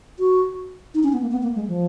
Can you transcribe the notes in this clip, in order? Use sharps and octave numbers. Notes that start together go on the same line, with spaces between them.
F#4
D#4
C#4
B3
A#3
B3
A#3
G#3
F3